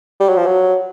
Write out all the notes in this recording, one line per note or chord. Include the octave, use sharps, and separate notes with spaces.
G3
F#3
F3
F#3